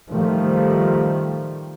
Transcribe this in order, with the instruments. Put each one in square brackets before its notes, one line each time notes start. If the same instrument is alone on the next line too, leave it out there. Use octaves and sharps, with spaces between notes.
[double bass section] D#3 F3 G3 A3